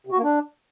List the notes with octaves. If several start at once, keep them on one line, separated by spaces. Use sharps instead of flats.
C3
F#4
A#3
D4